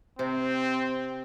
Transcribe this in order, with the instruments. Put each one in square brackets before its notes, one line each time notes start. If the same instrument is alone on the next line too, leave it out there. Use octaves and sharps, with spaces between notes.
[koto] C3 [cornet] C4